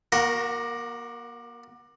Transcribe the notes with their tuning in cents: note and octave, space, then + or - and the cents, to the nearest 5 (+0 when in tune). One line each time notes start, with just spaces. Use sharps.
A#3 +35 F#4 +0 A#4 +0